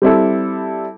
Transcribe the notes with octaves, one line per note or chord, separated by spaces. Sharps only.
G3 C4 E4 A4